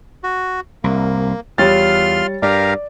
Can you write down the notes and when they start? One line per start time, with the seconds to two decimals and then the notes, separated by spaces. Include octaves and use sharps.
0.24 F#4
0.84 C2 A#3
1.58 E2 G3 F4 C#5 C6 F6 A6
2.42 G2 G4 A#4 D5 F5